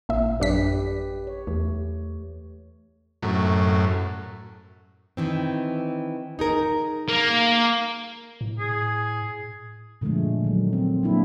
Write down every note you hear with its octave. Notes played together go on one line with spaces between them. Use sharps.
A1 A#2 E5
F#2 D4 G4 B4 B6
C#5
E2 A3
F#2 A2
D#3 E3 C4
D#4 G#4 A#4
A#3
A2
G#4
A#2 D3 F3 G#3 A3
D#3 F#3
C4
F#3 A#3 D4 E4